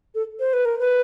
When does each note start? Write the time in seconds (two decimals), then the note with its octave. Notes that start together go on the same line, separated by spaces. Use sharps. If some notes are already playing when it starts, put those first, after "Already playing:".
0.15 A4
0.40 C5
0.53 B4
0.65 A#4
0.79 B4